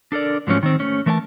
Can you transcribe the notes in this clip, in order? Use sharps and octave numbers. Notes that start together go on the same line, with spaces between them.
D4 A4 A#4 D5
G#2 F3 F#3 A3 C#4
D#3 C4
A3 C#4
E3 A3 A#4 D5 A5